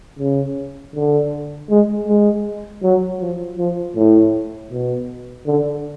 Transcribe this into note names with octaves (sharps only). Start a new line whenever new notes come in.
C#3
D3
G#3
G#3
F#3
F3
F3
A2
B2
D3